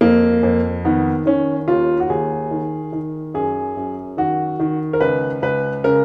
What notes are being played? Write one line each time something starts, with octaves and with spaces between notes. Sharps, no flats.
F2 A#3
F2
D#3 B3
D#3 C#4
D#2 F4
F#4
D#2 G#4
D#3
D#3
F#2 G#4
F#2
D#3 F#4
D#3
A#4
C#2 B4
C#2 B4
C#3 A#4